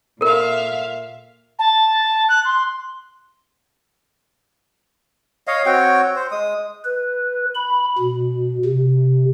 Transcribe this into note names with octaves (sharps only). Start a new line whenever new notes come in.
A#2 A4 A#4 E5 F5
A5
F#6
C6
C#5 D#5 F5
C4 F#4 C#5 G5
C5
G#3 D#6
B4
B5
B2
C3